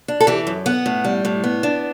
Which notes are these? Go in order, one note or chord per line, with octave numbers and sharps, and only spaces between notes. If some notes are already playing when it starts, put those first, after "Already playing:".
D4
A4
E3 G4
F#2
B3 F#5
A2
G3
A2
B3
D4